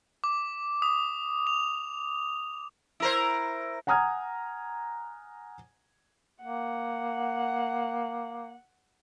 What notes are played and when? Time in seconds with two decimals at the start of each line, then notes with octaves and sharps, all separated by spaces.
0.24 D6
0.82 D#6
1.47 F7
3.00 E4 A#4 C5
3.87 F#5 G#5 A#5 D#6 F6 G#6
6.42 A#3 F#5